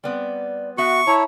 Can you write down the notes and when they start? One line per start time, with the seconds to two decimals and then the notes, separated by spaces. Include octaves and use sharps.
0.04 G3 B3 C4 D5
0.78 B3 F#4 E5 C#6
1.07 E4 C#5 A5 A#5